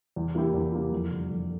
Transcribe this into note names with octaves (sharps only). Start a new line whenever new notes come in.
E2
E3 A#3 E4 G4
E2
E3 A#3 E4 G4
F2
D3 G3
F2